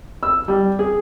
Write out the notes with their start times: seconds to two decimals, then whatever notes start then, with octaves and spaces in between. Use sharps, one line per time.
0.23 E6
0.48 G3
0.79 G#4